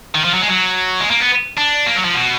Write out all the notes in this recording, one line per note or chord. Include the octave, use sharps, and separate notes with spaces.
D#3
F3
F#3
G#3
F#3
G#3
A#3
B3
D4
A#3
F#3
F3
B2